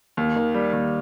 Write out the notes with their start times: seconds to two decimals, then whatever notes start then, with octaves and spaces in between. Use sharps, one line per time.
0.17 D#2
0.36 D#3
0.54 G3
0.73 D#2